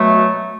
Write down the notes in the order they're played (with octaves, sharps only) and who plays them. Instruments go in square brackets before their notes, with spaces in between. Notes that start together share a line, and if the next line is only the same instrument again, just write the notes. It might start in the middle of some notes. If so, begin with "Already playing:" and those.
Already playing: [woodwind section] B2 F#3 A3